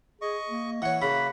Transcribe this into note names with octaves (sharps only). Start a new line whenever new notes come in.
G#4 D#5 C#6
A#3
E3 C#5 F#5
C#3 A#3 F#4 B5